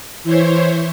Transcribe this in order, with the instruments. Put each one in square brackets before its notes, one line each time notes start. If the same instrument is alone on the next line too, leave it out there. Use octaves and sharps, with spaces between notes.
[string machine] E3 E4 C5 C#5